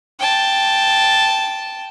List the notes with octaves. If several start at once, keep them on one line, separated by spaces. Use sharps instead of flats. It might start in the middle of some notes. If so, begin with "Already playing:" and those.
G5 A5